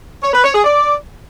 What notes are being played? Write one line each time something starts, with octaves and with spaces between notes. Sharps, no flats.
C#5
B4
C#5
G#4
D5